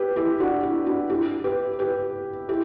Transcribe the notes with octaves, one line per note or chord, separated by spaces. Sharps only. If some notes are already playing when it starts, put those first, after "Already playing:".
Already playing: G4 B4
E4 G4
D4 F#4
E4
D4 F#4
E4 G4
G4 B4
G4 B4
E4 G4